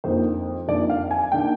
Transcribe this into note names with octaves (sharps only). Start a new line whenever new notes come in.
F2 D#3 A#3 D4 C5
F2 D#3 A#3 D4 D5
F5
G#5
D#3 A#3 D4 G5